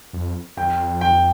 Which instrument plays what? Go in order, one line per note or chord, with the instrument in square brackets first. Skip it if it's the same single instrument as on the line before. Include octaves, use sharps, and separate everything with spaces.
[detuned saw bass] F2
[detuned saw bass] F2 [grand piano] G5
[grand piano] G5